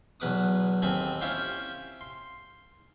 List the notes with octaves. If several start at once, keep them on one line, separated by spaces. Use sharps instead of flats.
B1 E2 B4 D6 D#6
D#2 C4 A4 G#5 B5
C#4 E4 F4 G4 C5 G5
C6